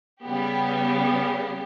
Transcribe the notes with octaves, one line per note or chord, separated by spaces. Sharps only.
C#3 G3 B3 G4